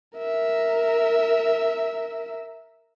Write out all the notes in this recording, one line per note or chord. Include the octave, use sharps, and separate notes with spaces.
A#4 E5